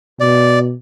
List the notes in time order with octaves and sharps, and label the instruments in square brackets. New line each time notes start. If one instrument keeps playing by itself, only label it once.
[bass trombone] B2 [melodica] D5